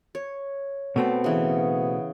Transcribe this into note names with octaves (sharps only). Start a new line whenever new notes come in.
C#5
B2 A3 B3 C4
C#3 E3